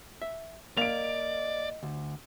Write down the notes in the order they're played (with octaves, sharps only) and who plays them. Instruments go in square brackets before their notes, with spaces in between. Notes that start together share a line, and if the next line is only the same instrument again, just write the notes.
[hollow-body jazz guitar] E5
[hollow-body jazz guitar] A#3 [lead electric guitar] D5 [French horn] D#5 [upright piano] D7 F7
[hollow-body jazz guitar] D2